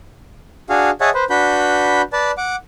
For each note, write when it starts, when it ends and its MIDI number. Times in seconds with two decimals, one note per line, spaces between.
0.70 0.90 62
0.70 0.90 66
0.70 0.90 68
0.70 0.90 77
1.01 1.10 68
1.01 1.10 73
1.01 1.10 75
1.01 1.10 76
1.01 1.10 78
1.01 1.10 81
1.14 1.24 71
1.14 1.24 72
1.30 2.02 62
1.30 2.02 66
1.30 2.02 71
1.30 2.02 83
1.30 2.02 91
2.13 2.31 71
2.13 2.31 74
2.13 2.31 81
2.38 2.56 78
2.38 2.56 86